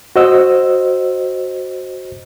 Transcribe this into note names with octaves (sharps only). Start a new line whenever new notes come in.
F#4 C5 D#5 E6